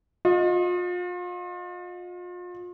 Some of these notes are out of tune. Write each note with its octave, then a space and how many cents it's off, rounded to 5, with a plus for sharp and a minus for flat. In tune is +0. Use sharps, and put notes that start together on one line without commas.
F4 +35 D#5 +0